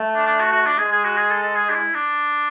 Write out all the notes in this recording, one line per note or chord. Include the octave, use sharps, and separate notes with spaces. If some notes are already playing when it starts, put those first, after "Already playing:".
Already playing: A3
D4
D4
F#4
F#4
D4
G#3 G#4
G#4
F#4
G#4
A4
A4
G#4
D4
E4
D4